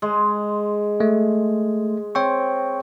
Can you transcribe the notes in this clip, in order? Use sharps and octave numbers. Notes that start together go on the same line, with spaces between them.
G#3
A3
C4 C#5 G5 C#6